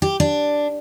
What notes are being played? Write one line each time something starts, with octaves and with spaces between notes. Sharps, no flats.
G4
D4